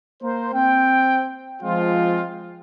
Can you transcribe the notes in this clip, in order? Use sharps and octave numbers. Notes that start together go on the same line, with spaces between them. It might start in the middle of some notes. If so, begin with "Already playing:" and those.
A#3 A#4 C5
C4 G5
F3 G#3 C4 F4